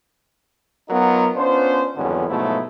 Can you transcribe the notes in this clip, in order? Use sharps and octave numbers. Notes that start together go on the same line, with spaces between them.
F#3 B3 D#4 F4 F#4 A#4
B3 C#4 D4 F4 C5
G#1 F2 D3 G3 B3 C#4
G#2 B2 F3 F#3 A3 E4